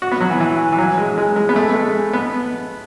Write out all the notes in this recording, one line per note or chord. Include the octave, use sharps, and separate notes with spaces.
F#4
B3
F#3
E3
E3
E3
F#3
G#3
G#3
G#3
B3
A3
G#3
B3